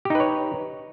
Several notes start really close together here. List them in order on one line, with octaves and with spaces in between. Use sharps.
G4 D#4 B4 C#5